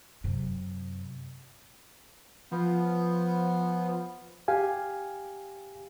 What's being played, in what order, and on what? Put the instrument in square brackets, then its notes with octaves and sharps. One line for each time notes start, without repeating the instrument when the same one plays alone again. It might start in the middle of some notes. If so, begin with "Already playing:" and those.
[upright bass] F#2 C3
[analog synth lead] F3 [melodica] B3
[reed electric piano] G4 F5 G#5